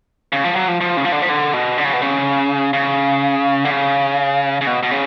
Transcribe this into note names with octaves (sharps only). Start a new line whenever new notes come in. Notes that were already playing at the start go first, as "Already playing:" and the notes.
C#3
F3
F#3
F3
F3
C#3
F3
D3
F3
D3
B2
D3
C#3
B2
C#3
C#3
D3
C#3
C#3
B2
B2
C#3